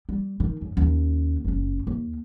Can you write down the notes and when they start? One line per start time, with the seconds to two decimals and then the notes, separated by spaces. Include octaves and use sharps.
0.09 G3
0.40 D#3
0.61 F#2
0.77 D#2 C#4
1.44 F#1 C#4
1.87 D#2